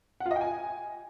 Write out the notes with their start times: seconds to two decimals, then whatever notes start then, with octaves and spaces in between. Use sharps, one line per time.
0.20 F#5
0.26 F4
0.31 D#5
0.36 G5
0.41 G#5